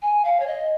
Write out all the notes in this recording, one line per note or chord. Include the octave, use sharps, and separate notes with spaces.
G#5
F5
C#5
D#5